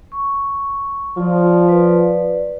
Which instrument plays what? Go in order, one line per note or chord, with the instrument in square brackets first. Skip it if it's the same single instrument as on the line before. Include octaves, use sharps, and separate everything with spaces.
[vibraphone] C#6
[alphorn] F3 [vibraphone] F4 D5
[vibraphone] B4 D5